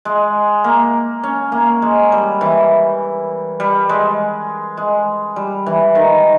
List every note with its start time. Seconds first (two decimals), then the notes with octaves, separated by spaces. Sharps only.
0.05 G#3
0.64 A#3
1.23 C#4
1.52 A#3
1.82 G#3
2.12 G3
2.41 E3
3.60 G3
3.89 G#3
4.77 G#3
5.36 G3
5.66 E3
5.95 D#3